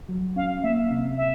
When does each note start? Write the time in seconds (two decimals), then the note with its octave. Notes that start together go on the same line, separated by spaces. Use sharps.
0.08 F#3
0.36 C#4 F5
0.63 A#3 E5
0.91 C3
1.17 E5